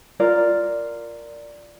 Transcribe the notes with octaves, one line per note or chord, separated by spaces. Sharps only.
F4 A#4 D5